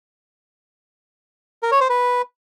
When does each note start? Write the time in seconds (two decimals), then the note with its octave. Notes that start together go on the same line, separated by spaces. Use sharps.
1.63 A#4
1.72 C#5
1.81 C5
1.89 B4